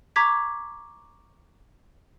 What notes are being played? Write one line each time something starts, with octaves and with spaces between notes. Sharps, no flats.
A#5 C#6 D6 G#6 B6